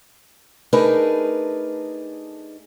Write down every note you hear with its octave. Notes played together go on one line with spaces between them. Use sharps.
A3 D4 D#4 G#4 A#4 B4